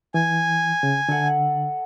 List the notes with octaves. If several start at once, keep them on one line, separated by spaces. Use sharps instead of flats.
E3 G#5
C#3
D3 A4 E5 F#5